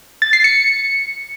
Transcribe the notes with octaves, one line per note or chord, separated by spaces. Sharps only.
A6
C7
C#7